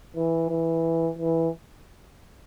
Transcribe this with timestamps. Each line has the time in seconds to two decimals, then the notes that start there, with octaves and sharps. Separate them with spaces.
0.16 E3
0.50 E3
1.18 E3